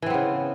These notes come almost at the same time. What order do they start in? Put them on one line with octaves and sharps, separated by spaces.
E3 C4 B3 C#3